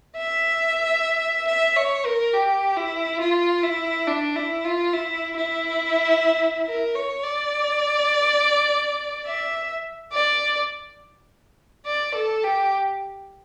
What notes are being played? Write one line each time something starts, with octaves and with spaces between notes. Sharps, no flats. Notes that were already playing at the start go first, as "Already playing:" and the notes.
E5
E5
C#5
A#4
G4
E4
F4
E4
D4
E4
F4
E4
E4
A#4
C#5
D5
E5
D5
D5
A4
G4